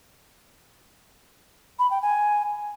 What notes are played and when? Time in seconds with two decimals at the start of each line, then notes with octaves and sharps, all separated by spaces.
1.79 B5
1.91 G5
2.02 G#5